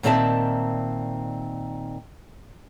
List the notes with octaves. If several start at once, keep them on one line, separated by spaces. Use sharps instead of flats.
A#2 D#3 C4 D5 E5 A5